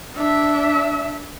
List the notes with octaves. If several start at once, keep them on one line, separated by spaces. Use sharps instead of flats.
D4 E5